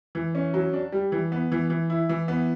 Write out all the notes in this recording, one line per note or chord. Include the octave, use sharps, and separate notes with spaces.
E3
C#4
F#3
D4
G3
E3
B3
E3
E3
E4
E3
B3